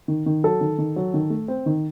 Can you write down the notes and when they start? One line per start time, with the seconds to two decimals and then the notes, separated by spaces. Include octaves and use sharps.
0.08 D#3
0.26 D#3
0.44 F#3 A4
0.61 D#3
0.78 D#3
0.96 F#3
1.14 D#3
1.30 A3
1.48 C4
1.66 D#3